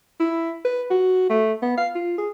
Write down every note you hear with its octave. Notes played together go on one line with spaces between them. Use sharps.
E4
B4
F#4
A3
B3
F5
F4
G#4